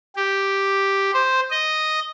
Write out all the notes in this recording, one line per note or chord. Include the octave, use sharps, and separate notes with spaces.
G4
C5
D#5